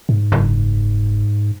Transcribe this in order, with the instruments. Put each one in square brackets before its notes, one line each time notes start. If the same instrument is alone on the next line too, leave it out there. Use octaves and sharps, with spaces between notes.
[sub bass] G#2
[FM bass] F#1